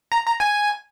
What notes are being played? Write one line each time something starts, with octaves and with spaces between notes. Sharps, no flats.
A#5
A#5
G#5